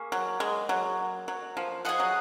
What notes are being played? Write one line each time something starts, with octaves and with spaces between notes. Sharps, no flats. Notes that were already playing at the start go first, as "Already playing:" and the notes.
Already playing: A#3 C#4 G#4
F#3
G#3
F#3
F#3
F3
F3 G#4 D#5 F#5
F#3